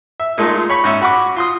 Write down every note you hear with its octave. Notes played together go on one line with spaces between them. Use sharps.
E5
A#2 G#3 A3 D#4 F4
C#5 B5 C#6
G#2 C#4 E5
F#4 B5 C#6 D6
F4 C6 D#6